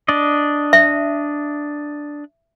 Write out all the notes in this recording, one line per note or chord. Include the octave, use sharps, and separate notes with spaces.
D4 D5 D#5
E5